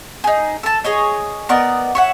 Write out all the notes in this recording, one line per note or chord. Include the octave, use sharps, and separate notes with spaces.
D#4 G#4
A4 A5
G#4 C#5 D#5
B3 A#4 D5 D#5
C#5 E5 F#5